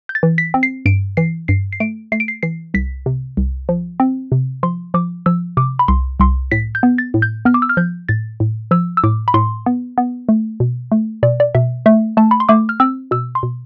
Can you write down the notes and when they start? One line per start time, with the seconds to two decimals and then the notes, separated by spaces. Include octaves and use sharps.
0.09 G6
0.15 A6
0.23 E3
0.38 B6
0.54 C4
0.63 C7
0.86 G2 D7
1.17 E3 C7
1.48 G2 C7
1.73 C7
1.80 A3 D7
2.12 A3 C7
2.20 D7
2.28 C7
2.43 E3 C7
2.74 C2 B6
3.06 C3
3.37 C2
3.69 F3
4.00 C4
4.32 C3
4.63 F3 C6
4.94 F3 D6
5.26 F3 E6
5.57 C3 D6
5.79 B5
5.88 C2 C6
6.20 C2 C6
6.51 A2 B6
6.75 G6
6.83 B3
6.98 A6
7.14 A2
7.22 G6
7.45 B3 F6
7.54 D6
7.62 E6
7.69 F6
7.77 F3 G6
8.09 A2 A6
8.40 A2
8.71 F3 E6
8.97 E6
9.04 A2 D6
9.28 B5
9.34 A2 C6
9.66 B3
9.98 B3
10.29 A3
10.60 B2
10.92 A3
11.23 B2 D5
11.40 D5
11.55 B2 E5
11.86 A3 E5
12.17 A3 A5
12.31 B5
12.40 C6
12.49 A3 D6
12.69 F6
12.80 C4 E6
13.11 B2 E6
13.35 C6
13.43 B2